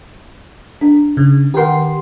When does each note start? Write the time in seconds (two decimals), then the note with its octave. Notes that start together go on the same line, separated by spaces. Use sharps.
0.81 D4
1.17 C#3
1.54 D#3 G4 A#4 F#5 C6